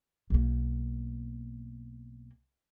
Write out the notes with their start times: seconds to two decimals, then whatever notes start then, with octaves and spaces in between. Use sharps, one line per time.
0.30 B1 A#3